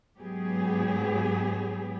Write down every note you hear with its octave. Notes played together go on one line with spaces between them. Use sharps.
G#2 F#3 B3 G4 G#4